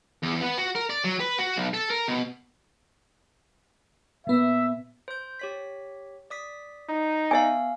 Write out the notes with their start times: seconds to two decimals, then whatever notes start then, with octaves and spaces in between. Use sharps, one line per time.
0.23 E2
0.41 B3
0.58 F#4
0.75 A#4
0.90 D5
1.04 F#3
1.20 B4
1.39 F#4
1.56 B1
1.74 A4
1.90 A#4
2.08 B2
4.27 A#2 B3 E5
5.08 C5 G6
5.39 G4 C#5 B6
6.30 D5 D#6 B6
6.89 D#4
7.31 B3 E5 F5 G#5